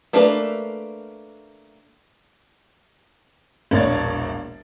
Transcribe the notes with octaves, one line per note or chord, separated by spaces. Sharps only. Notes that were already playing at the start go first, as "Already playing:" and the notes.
A3 A#3 D4 G#4 B4
E1 A#1 A#3 D4 C#5 A6